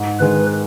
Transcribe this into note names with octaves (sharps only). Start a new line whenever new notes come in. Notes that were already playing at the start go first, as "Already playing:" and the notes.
Already playing: G#2
D#3 G#3 B4